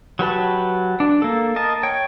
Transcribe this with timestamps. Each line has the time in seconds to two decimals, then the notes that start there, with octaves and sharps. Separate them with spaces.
0.19 F#3 G4 B4 A5
1.00 D4
1.22 A#3 A4
1.56 A#4 D#5 A5
1.83 C#5 G5